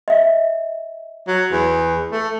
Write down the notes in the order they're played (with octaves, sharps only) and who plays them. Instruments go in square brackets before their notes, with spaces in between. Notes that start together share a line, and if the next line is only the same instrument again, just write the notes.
[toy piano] D#5 E5
[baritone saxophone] F#3
E2
A3